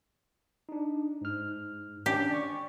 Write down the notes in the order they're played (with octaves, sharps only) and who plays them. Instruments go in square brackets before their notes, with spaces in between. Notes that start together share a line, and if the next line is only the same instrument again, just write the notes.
[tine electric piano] D4 D#4
G#2 F6
[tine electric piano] C#4 D4 [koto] G4
[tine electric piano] D5 G5 C#6